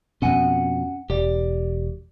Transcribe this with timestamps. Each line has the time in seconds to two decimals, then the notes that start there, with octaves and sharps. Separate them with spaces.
0.22 F2 B2 C#4 F#5 G#5
1.10 E1 G4 D5